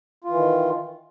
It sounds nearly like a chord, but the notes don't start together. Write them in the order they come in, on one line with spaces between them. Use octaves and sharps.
F4 E3 D#3